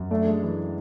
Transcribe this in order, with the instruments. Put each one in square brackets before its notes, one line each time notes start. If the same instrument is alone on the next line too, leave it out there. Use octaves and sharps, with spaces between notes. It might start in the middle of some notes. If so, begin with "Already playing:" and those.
Already playing: [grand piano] F#2
[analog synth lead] A3 [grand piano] D4
[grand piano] G#3
E3